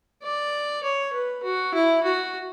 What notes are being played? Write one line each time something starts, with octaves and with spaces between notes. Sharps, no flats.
D5
C#5
B4
F#4
E4
F#4